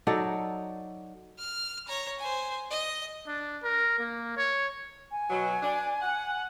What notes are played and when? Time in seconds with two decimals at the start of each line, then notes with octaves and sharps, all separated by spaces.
0.07 F#3 D#4 A4 D5
1.38 F6
1.88 C#5 A#5
2.19 C5 G#5
2.70 D#5
3.27 D4
3.64 A#4
3.99 A#3
4.37 C#5
5.11 G#5
5.30 B2 F#3
5.62 D4
6.02 F#5